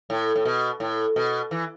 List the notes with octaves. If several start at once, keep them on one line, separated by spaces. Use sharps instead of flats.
A2
A2
B2
A2
B2
E3